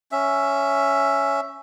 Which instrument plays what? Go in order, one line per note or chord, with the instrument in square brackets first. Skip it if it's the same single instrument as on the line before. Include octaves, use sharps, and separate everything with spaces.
[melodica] C#4 E5